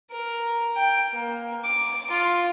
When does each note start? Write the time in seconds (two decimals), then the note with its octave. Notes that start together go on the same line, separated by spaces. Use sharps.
0.11 A#4
0.76 G5
1.12 A#3
1.65 D6
2.11 F4